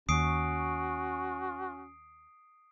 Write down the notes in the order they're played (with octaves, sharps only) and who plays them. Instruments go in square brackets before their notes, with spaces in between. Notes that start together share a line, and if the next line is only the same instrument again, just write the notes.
[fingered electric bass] D#2 [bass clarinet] C#4 [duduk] F#4 [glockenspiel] D#6 C7 D7